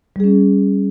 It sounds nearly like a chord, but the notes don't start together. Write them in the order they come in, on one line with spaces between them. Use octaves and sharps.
G3 G#4 C#4